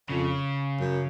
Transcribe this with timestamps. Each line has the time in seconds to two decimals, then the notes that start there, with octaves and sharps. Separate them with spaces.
0.10 F2 C#3
0.80 F#2